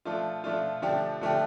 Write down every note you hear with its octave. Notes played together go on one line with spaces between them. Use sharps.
F3 A3 D4 F4
F3 A3 D4 F4
D3 F3 A3 D4 G4
D3 F3 A3 D4 G4